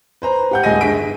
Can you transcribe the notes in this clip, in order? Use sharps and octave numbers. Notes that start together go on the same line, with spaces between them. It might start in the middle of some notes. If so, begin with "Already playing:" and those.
B4 C5 A#5
G4 F#5 G6
D#1 G#3 D#5 G#5 A#6 D#7
G1 G#3 G#4 B6 D7